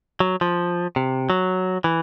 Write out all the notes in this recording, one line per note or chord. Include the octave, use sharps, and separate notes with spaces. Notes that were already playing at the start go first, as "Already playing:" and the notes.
F#3
F3
C3
F#3
E3